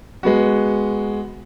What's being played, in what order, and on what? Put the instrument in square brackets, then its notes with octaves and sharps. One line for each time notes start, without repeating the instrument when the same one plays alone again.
[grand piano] G#3 B3 F#4